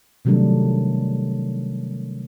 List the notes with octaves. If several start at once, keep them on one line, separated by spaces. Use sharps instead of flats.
C3 D#3 F#3 G3 A3 D4